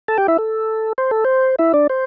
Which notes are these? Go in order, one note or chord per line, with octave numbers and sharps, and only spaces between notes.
A4 A5
G4 G5
E4 E5
A4
C5
A4
C5
E4 E5
D4 D5
C5